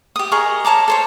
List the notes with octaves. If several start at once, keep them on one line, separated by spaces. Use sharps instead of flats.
G4 D#6
G#4 A#4 D#5 C#6
C#5 A5 A#5 D6
A4 C5 C#5